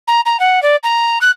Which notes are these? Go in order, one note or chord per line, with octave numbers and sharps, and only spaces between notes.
A#5
A#5
F#5
D5
A#5
F#6